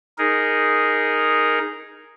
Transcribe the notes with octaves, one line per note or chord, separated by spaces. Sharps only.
D#4 G#4 A#4